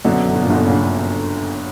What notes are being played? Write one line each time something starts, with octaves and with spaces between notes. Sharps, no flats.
F#2 B2 D3
G1
B2
A#2
G1 B2
A#2 C#3
D3